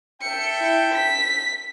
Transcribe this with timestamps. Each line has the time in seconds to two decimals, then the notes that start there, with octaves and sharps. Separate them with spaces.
0.22 A4 E5 G5 C#7
0.61 E4
0.93 B6